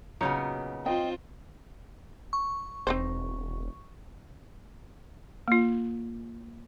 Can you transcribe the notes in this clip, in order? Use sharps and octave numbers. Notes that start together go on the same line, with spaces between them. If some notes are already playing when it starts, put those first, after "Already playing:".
A#2 C#3 F#3 B3 D#4 C#5
C4 F4 D#5 G5
C#6
E1 C4 D#4 C5
A#3 F4